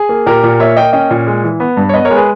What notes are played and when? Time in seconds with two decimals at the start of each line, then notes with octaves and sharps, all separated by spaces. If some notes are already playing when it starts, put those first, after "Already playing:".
Already playing: G#4
0.09 A#3
0.26 A#2 G4 A#4
0.43 A#2
0.60 A#3 C#5 E5
0.76 A#3 D#5 G5
0.93 C#4 D#5 G5
1.10 A#2
1.27 G#3
1.43 E3
1.60 B3
1.77 G2
1.89 C#5
1.94 B3 B4 D#5
2.05 A#4 C#5
2.10 G#3
2.16 G#4 B4